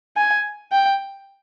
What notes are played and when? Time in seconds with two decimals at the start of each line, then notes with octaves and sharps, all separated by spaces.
0.17 G#5
0.72 G5